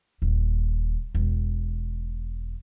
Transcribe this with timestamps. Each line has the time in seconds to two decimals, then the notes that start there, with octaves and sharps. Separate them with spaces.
0.22 D#1
1.15 E1